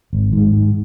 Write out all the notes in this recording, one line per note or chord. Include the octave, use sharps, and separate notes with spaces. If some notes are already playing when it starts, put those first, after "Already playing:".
G#1
G#2 G#3
G#2